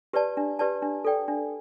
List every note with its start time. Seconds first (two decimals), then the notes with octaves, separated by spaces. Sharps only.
0.13 G4 B4 D5 A5
0.37 D4
0.59 G4 B4 D5 A5
0.82 D4
1.05 A4 D5 G5
1.28 D4